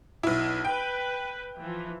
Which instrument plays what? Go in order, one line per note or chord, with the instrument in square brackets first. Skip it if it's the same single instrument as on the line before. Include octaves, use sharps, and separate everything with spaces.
[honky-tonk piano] B1 E4
[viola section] B4 [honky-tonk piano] G5
[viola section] E3 F3